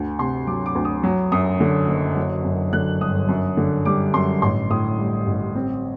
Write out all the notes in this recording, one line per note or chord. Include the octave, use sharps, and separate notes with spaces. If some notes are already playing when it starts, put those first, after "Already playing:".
Already playing: D2
C3 C6
F#3 D6
D6
D2
D#6
F#3
F#2 D#6
D3
F#1
F#3
F#2
D3 F#6
G1 D#6
F#2
D3
G3 D6
F#2 C6
A1 C6
A2 D#6
G3
A1
C4